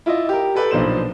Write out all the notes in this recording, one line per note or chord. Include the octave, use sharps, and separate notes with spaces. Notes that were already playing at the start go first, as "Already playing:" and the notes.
E4 F4 D5 D#5
G4 A#4
G4 A4 B4 D5 G5
B1 A#2 F3 D4 C5 E7